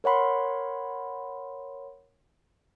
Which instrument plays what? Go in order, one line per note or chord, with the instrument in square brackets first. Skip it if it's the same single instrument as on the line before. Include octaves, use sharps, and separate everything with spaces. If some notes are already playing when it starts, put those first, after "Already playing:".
[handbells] A#4 C#5 F#5 B5 C6